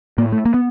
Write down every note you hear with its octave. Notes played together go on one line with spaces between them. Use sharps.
A2 A#3
A3
A#3
B3